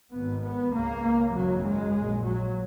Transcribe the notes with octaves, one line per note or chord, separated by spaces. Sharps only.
G#1 G#2 B3
B3
C#2 C#3 A#3
G#1 F#2 C#3 F#3
G#3
A#1 A#2
F#3